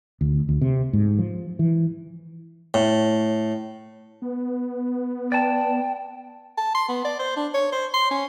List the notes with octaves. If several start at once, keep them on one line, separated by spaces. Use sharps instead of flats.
D2
D2
C3
G#2
F3
E3
A2
B3
D5 G5 A5
A5
C6
B3
D5
C5
D4
C#5
C5
C6
C#4